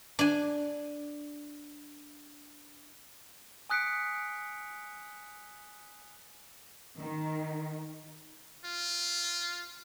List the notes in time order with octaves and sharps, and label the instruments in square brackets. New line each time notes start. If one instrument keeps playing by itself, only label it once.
[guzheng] D4 G#5
[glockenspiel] G#5 D#6 F#6 B6 C#7 D7
[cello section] D#3
[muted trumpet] F4